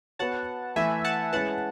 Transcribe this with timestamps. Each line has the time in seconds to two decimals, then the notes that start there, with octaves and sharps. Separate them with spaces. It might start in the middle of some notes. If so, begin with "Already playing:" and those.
0.19 B3 F#4 C#5 F#5 A5
0.76 E3 A3 E4 E5 G#5
1.04 F#5 A5
1.33 G#3 C#4 E4 B4 F#5 A5